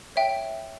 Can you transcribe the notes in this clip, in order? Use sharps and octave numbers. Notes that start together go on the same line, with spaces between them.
C#5 E5 G5